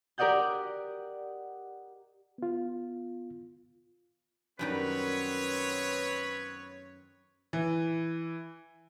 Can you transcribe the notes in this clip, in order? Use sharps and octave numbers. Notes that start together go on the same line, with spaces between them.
G4 A#4 D5 D#5 F#5 G6
B3 F4
F#2 D#3 G3 B3 C4 B4 C#5
E3